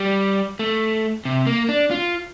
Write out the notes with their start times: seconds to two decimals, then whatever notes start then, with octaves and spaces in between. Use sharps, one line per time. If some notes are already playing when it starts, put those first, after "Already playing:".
Already playing: G3
0.59 A3
1.25 C3
1.47 A#3
1.69 D4
1.91 F4